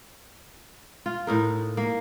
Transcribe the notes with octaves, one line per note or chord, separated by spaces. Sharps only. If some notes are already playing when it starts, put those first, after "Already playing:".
F4
A2 D#4 A#4
A#3